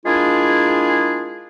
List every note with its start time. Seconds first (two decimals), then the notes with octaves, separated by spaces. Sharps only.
0.06 G#3 A#3 D4 E4 F4 G#4